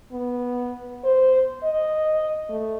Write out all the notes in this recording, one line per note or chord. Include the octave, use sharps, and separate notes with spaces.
B3
C5
D#5
A3